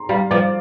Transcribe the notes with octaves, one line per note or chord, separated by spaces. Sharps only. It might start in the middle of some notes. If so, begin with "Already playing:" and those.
Already playing: A#5 C6
G3 F5
F3 D5